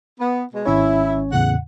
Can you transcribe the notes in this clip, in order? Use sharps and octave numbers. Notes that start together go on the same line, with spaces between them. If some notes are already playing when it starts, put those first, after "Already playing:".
B3
B2 G#3
G#1 C#4 E4 C#5
E2 A2 C#3 F#5